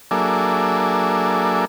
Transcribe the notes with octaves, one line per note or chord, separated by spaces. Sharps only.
F#3 A#3 D4 G#4 A4 E5